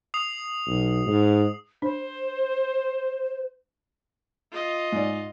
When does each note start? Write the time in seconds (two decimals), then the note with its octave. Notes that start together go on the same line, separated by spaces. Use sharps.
0.14 D#6 C7 F7
0.67 B1
1.06 G#2
1.82 D4 C5
4.51 F4 D#5
4.92 G#2 D5